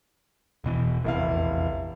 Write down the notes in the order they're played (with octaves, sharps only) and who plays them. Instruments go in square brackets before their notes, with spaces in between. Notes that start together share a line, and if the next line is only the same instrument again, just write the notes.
[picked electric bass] E1 B2 E3
[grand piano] F1 E4 F5 [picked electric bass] A#1 E2